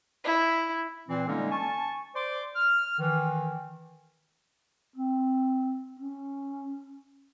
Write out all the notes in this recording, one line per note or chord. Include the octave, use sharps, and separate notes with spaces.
E4
A#2 E3 C4
D3 G3 G#3 A#3 C#4 D#4
G#5 A5 C#6
C5 D5 C6 D6
F6
D#3 E3
C4
C#4